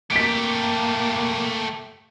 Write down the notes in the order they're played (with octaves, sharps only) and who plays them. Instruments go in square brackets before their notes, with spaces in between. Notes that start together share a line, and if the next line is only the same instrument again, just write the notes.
[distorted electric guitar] A3 G4 [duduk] A#3 [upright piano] B6 D7